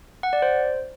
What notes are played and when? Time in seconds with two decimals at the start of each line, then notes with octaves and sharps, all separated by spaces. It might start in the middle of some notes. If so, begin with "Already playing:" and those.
0.23 F#5
0.33 D5
0.42 C5